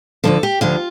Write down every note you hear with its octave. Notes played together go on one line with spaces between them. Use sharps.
D2 D3 F3 A4
G4
D2 D3 F3 F4